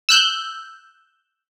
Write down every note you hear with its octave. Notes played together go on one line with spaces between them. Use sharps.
E6 F#6 G6